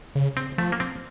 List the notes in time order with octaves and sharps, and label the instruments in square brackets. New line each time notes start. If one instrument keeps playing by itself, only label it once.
[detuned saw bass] C#3
[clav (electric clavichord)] C4
[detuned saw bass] F3 [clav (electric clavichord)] A3
[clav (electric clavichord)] A#3
C4